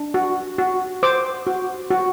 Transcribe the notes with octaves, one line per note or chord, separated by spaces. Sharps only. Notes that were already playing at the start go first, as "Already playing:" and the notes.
Already playing: D4
F#4
F#4
C5 D6
F#4
F#4